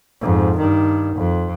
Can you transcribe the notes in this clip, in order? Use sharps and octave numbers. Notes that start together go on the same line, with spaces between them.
F2 G#2
G2 D#3
F2